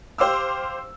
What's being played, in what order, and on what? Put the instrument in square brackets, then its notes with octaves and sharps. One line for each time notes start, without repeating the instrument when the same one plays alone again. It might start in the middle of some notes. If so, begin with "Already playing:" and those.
[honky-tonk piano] G4 C5 F5 D6 E6